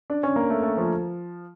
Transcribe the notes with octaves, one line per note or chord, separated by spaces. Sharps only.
D4
C#4
A#3
A3
A3
F3